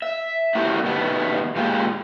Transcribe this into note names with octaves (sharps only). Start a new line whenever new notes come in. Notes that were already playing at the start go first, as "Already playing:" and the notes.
E5
A3 E4 F#4 G4 A#4
B2 D#3 G3 A3 B3
A#2 G#3 F4 G4 A4